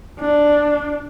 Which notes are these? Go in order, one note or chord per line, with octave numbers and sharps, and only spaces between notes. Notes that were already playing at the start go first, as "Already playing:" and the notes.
D4